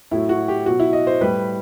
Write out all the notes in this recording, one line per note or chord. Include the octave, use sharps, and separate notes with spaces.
A2 F#3 E4
F#4
G4
B2 F#3 F#4
E4
D#5
C5
A2 G3 B4